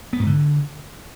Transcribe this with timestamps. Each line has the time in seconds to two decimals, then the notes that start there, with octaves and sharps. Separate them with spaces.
0.13 B3
0.20 G#2
0.26 D3